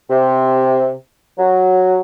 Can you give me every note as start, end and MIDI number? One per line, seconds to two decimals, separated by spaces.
0.10 0.92 48
1.38 2.00 54